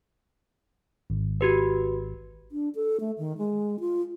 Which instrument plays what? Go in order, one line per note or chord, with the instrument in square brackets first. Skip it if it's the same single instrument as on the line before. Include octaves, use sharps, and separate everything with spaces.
[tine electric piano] G#1
[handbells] F#4 G4 B4
[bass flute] D4
A4
A3
D#3
G#3
F4